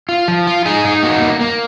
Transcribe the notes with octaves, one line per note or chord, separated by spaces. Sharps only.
F4
F3
F4
D#4 G#4
D#4
A#3 F#4
A#3
A#3